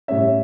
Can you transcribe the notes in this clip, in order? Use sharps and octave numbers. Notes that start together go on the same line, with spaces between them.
A2 G3 C#4 E5